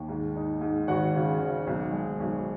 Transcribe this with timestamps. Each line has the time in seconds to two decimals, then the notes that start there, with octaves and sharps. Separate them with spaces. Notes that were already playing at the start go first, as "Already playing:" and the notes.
Already playing: D#2
0.09 G#2
0.36 D#4
0.61 G#2
0.87 G#1 F#4 F#5
1.15 C#3
1.40 G#1
1.67 B1
1.93 G#3
2.20 B1